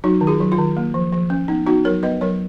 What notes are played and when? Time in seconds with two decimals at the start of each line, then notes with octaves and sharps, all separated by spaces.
0.04 F#3 D#4 F#4
0.21 D#3
0.27 F4 G#4
0.40 F#3
0.52 F4
0.58 D#3
0.77 A#3
0.94 F3
1.12 F3
1.30 C#4
1.48 B3 D#4
1.66 B3 D#4 F#4
1.85 F#3 A#4 C#5
2.03 B3 B4 D#5
2.21 F#3 A#4 C#5